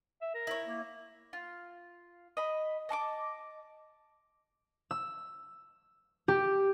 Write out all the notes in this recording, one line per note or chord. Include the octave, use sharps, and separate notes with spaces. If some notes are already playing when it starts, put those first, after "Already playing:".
E5
A#4
E4 C#5
A#3
F4
D#5 B5
D#5 A5 C#6 D6
E6
G4